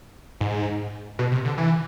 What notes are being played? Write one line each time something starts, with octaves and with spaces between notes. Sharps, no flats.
G#2
B2
C3
D3
E3